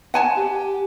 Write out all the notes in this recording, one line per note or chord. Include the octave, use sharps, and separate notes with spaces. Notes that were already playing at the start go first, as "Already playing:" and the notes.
F#5 G#5 A5
G4